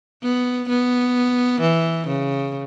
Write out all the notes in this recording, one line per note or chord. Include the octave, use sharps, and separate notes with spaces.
B3
B3
E3
C#3